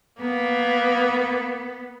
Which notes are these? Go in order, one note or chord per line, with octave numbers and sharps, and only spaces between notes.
A#3 B3